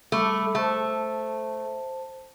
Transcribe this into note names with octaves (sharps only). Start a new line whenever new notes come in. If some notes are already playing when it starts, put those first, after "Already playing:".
G3 A3 B5 D6
A3 C5 A5